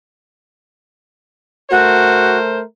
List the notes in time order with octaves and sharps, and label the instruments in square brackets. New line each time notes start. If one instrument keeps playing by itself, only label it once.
[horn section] A3 A#4 C5 [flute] F#4